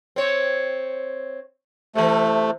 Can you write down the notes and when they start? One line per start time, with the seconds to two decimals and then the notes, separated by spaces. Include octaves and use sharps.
0.16 C4 C#5
1.95 C3 E3 A3